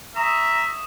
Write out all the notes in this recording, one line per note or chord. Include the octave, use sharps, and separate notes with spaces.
E5 A#5 C#6 D#6 E7